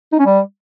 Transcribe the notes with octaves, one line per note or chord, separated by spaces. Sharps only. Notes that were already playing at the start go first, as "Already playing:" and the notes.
D#4
C#4
G3